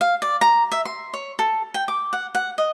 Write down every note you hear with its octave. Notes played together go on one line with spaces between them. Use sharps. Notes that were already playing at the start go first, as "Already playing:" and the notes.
F5
D5
A#5
E5
C6
C#5
A4
G5
D6
F#5
F#5
D#5